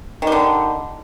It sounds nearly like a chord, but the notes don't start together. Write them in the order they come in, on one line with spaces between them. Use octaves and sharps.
D#3 G3 D3